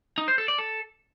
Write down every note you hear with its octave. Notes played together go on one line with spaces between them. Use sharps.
D#4
C5
A4
D5
A4